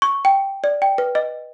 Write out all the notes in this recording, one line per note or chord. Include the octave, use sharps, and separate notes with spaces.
C#6
G5
D5
G5
B4
D#5